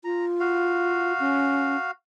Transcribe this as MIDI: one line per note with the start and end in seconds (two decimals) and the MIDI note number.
0.04 1.13 65
0.04 0.26 82
0.40 1.91 66
0.40 1.91 77
1.20 1.76 61